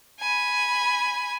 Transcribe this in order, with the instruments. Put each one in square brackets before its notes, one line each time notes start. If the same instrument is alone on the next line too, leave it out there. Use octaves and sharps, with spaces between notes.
[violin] G#5 B5